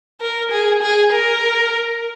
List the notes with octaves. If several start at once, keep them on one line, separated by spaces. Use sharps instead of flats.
A#4
G#4
G#4
A#4